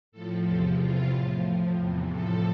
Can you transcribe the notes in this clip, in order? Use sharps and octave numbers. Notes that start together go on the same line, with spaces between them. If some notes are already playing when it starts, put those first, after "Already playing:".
A2 F3 A4
E2 C3 F3 A4
E2 C3 E3 F4
A2 F3
A2 F3
E2 C3 E3
A2 F3 A4